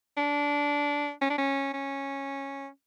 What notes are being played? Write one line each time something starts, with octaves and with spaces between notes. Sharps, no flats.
D4
C#4
D4
C#4
C#4